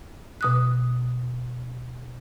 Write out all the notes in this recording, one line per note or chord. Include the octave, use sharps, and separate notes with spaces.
B2 D#6 F#6